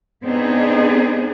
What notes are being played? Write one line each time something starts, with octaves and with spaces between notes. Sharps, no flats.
B3 C4 D4 D#4 G#4